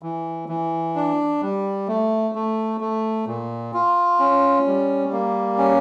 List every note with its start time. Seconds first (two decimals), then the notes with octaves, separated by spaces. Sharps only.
0.03 E3
0.49 E3
0.96 D4
1.42 G3
1.88 A3
2.35 A3
2.81 A3
3.27 A#2
3.74 F4
4.19 C#4
4.66 G3
5.12 A#3
5.58 C#4